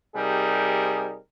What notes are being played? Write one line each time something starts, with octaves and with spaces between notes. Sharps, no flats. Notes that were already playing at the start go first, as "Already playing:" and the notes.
C3 G3 D#4 G#4 A#4